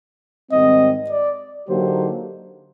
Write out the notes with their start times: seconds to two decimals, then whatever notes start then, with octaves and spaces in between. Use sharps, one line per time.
0.52 G#2 D#3 G3 C4 D#5
1.10 D5
1.68 D3 F#3 A#3 D#4 G4 C5